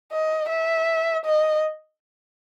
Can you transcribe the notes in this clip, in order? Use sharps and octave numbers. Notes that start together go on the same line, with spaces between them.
D#5
E5
D#5